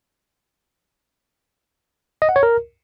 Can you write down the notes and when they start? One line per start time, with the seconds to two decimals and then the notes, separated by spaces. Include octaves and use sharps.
2.22 D#5
2.29 F#5
2.36 C#5
2.43 A#4